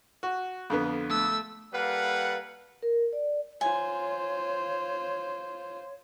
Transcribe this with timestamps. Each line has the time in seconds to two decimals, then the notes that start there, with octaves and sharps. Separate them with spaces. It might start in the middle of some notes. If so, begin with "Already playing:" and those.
0.23 F#4
0.70 F2 D3 B3
1.10 A3 E6
1.73 G3 A#3 A4 B4 F5 F#5
2.83 A#4
3.13 D5
3.61 F4 C5 C#5 G#5